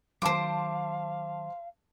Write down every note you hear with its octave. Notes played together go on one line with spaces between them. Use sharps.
D#3 F#3 C5 F5 A5 C6 D6 D7